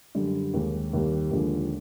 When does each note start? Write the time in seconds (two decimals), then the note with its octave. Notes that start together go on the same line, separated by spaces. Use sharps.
0.15 F#2 D3 G3
0.54 D#2 D#3 G#3
0.93 D#2 D#3 G3
1.31 D#2 D3 F3 G#3